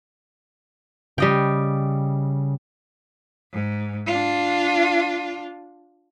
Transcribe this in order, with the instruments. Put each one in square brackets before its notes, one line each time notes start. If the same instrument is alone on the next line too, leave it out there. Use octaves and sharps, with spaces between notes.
[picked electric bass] C#3 [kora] G3 D#5 G5
[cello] G#2
D4 F4